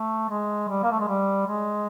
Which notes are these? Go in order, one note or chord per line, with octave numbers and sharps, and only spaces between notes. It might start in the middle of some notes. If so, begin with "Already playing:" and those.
Already playing: A3
G#3
G3
A#3
A3
G#3
G3
G#3